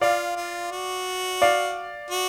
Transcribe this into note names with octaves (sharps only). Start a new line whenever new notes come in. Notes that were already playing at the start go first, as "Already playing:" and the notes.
F4 D5 F5
F4
F#4
D5 F5
F#4